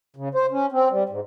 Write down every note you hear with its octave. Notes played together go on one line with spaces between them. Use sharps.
C#3
C5
C#4
C4
G3
G#2